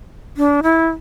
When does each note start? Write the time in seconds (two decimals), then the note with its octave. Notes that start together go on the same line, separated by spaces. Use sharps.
0.37 D4
0.63 E4